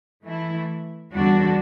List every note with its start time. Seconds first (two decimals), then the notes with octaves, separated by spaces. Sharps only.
0.24 E3 A3 E4
1.13 E2 D3 G3 D4 F#4